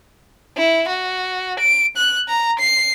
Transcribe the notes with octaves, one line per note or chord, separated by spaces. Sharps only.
E4
F#4
D7
F#6
A#5
C7